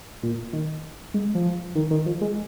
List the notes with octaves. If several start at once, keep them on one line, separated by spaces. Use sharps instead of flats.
A#2
D#3
G#3
F3
D#3
D#3
F3
G#3